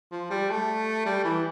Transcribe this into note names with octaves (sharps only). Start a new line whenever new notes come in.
F3
G3
A3
G3
E3